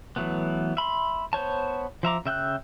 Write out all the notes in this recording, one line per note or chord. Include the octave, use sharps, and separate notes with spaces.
E3 F#3 A3 B3
E5 B5 C6
B3 C5 C#5 A5
F3 E5 A#5 D6
C#3 E5 G5 E6 F#6